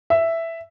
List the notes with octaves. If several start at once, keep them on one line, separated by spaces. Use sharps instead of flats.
E5